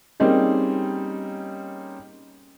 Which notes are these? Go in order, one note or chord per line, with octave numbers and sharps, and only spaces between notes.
G3 A#3 C4 C#4 D#4 G#4